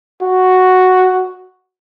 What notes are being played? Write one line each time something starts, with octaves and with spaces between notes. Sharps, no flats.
F#4